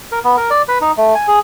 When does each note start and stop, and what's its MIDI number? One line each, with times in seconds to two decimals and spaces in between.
0.12 0.19 70
0.24 0.36 59
0.37 0.50 70
0.51 0.62 74
0.68 0.78 71
0.81 0.92 63
0.98 1.15 57
1.15 1.26 80
1.28 1.39 68